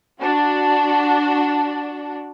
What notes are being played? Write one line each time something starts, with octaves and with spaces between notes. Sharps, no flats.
D4 F#4